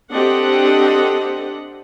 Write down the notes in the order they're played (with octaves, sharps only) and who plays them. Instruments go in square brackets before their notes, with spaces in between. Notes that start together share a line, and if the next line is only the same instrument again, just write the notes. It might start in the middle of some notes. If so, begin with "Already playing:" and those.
[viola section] C4 D4 G4 A4 D#5 F#5